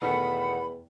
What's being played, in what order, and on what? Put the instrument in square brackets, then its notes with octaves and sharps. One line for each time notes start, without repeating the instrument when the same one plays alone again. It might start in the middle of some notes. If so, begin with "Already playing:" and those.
[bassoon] E2 [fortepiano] B2 D#3 A3 [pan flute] F#5 [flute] B5